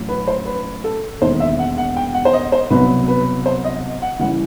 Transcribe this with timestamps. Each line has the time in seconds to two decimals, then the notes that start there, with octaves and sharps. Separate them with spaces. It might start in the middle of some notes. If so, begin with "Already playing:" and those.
Already playing: A1 A2 F#3
0.09 B4
0.28 C5
0.46 B4
0.84 A4
1.21 E1 D#2 D#3 C5
1.40 E5
1.59 F#5
1.77 F#5
1.96 G5
2.14 F#5
2.25 C5
2.33 D#5
2.52 C5
2.70 C2 B2 F#3 B4
3.08 B4
3.46 C5
3.64 D#5
4.02 F#5
4.20 F#1 E3 G3 F#5